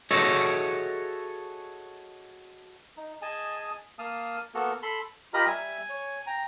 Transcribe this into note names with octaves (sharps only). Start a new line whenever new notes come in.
F#4 G#4 A4 C#5 D#5 E5
D#4
G#4 D#5 G#5 A5
A#3 F5 A5 D#6
A#3 B3 F#4 A4
A4 B5 C6
F4 G4 A#4 D#5 A#5 B5
G3 E5 G#5
C#5
G5 A#5